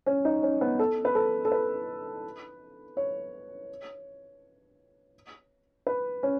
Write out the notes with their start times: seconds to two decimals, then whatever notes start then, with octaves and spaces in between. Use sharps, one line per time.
0.06 C#4
0.25 D#4
0.43 C#4
0.61 B3
0.79 A4
1.05 B4
1.15 A4
1.45 A4
1.52 B4
2.97 C#5
5.87 B4
6.23 C#4